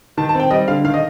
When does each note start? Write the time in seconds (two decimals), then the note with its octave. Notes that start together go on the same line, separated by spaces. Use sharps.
0.17 D#3 A5
0.29 A5
0.35 C4
0.40 G5
0.51 G3 D#5
0.68 D3 F5
0.84 D#3 F5
0.94 D#5